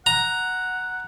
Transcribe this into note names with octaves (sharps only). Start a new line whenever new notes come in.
F#5 A#5